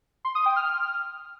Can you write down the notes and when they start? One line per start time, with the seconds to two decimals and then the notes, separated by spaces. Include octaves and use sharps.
0.25 C6
0.35 D#6
0.46 G5
0.56 F6